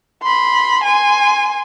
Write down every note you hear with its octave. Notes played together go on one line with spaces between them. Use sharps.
B5 C6
G#5 C6